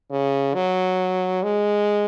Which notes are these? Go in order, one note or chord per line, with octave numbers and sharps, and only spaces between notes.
C#3
F#3
G#3